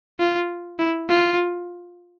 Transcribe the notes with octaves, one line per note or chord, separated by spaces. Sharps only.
F4
E4
F4